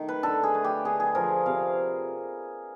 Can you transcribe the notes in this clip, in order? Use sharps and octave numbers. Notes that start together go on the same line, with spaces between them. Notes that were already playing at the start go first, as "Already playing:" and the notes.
Already playing: D#3 A3
B4
D3 A4
G#4
A3
G4
D3 G#4
G#4
F3 A#4
C3 F5